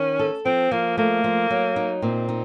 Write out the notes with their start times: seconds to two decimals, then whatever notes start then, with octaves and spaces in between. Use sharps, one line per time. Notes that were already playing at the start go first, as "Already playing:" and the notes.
Already playing: D#3 C#4
0.19 A4
0.45 F3 C4
0.71 F3 A#3
0.98 A3 A#3
1.24 F3
1.50 F#3
1.76 D#4
2.02 A#2 C4
2.29 D#4